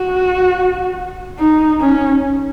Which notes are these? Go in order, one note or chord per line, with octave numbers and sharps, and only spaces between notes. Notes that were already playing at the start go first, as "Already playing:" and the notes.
Already playing: F#4
D#4
C#4